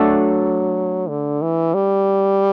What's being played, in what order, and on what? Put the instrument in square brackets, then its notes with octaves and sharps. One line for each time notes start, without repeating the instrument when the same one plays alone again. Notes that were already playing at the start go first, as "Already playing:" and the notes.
Already playing: [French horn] F#3 [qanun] A3 D4 F#4 A4
[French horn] D3
E3
G3